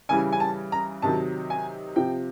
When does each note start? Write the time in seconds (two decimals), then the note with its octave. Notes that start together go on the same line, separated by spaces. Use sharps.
0.09 C#3 E3 G3 G#5
0.32 G#5
0.40 A5
0.72 A#5
1.02 C3 D#3 F#3 A5
1.50 G#5
1.96 C3 F3 G5